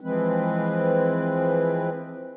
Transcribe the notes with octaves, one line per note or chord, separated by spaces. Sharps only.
E3 F3 G#3 C4 B4